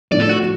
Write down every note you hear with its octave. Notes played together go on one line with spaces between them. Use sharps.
A2 F3 A3 D4 D5
A4
F#4